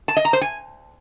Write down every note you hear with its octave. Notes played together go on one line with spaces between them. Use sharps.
A5
D#5
A#5
C5
G#5